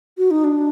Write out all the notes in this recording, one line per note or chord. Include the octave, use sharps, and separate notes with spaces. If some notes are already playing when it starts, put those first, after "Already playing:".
F#4
D#4
D4